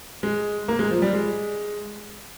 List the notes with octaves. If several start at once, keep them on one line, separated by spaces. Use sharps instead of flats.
G#3
A#3
G#3
F3
G3
G#3